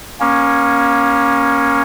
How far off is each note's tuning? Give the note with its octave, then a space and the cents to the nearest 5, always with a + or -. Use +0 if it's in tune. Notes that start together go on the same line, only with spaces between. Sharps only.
A#3 +25 C#4 +0